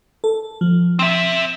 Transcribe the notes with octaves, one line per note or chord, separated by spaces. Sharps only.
A4
F3
C4 E5